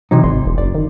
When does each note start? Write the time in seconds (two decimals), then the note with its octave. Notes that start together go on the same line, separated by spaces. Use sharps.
0.11 C3 E3 F#3 D#4
0.24 G#1 D5 C6
0.46 E1
0.58 F#1 D5
0.75 D#3